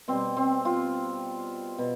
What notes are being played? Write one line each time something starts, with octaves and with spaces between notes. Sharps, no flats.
B2 G3 C4
C4
F4
B2